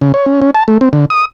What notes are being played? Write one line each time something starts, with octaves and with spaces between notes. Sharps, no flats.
C#3
C#5
C#4
C#4
A5
A3
C4
D3
D#6